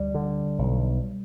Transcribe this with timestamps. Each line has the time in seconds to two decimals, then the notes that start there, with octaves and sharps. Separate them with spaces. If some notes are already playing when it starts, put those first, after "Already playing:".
Already playing: D2 G3
0.14 D3
0.59 B1